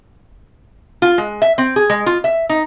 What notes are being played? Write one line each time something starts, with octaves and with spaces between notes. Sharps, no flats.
F4
G#3
E5
C4
G#4
G#3
F4
E5
D#4